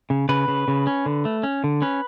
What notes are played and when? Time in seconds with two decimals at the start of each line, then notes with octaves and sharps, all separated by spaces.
0.10 C#3
0.29 C#3 B4
0.48 C#3
0.68 C#3
0.87 C#4
1.06 D3
1.25 A3
1.43 C#4
1.64 D3
1.82 C#4 B4